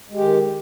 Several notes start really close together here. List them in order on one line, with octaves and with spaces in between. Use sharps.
G#3 G4 D#3